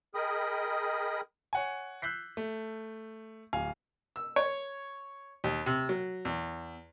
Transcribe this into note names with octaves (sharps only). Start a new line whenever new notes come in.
G#4 A#4 D#5 G5 B5 D#6
C#5 F#5 G#5
E6 F#6 G6 B6 C7
A3
D1 F5 G#5
E6
C#5
D#2
C3
F#3
E2